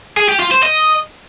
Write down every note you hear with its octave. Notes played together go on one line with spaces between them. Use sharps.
G#4
G4
F4
C5
D#5